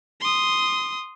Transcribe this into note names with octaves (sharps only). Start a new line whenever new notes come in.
C6 D#6